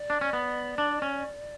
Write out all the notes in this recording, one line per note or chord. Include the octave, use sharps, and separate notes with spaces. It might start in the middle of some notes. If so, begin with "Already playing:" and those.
Already playing: D5
D4
C#4
B3
D4
C#4